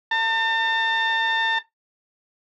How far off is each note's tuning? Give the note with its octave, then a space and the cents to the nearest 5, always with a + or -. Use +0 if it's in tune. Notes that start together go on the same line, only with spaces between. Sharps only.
A5 +40